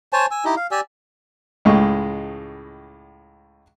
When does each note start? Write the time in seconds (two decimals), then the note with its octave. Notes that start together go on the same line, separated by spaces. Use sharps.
0.13 C5 C#5 G#5 A5
0.31 G#5 E6
0.45 D#4 E4 G4 D#5
0.56 F5
0.71 G4 D5 G#5 E6
1.65 C#2 A2 G#3 D#5 C#6